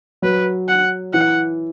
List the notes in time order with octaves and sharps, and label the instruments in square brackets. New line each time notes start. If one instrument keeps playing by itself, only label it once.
[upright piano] F#3 [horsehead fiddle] B4
[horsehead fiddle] F#5
[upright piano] E3 [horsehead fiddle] F#5